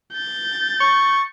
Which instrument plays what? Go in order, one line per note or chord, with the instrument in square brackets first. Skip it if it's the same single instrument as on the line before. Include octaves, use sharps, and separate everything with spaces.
[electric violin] G6 A6
[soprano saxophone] C#6